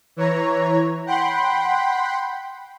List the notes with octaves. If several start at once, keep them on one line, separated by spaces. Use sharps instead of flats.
E3 C#5 A#5
F#5 G5 B5 C6